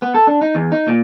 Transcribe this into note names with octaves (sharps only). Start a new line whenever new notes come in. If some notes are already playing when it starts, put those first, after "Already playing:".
B3
A4
D4
D#4
E2
D#4
A#2